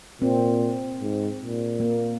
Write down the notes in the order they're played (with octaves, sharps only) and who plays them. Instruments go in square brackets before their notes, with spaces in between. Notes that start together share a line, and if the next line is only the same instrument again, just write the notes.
[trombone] A#2 [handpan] C4
[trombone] G#2
A#2
[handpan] A#3